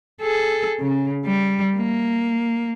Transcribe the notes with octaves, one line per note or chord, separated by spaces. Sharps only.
G#4 A4
C#3
G3
A#3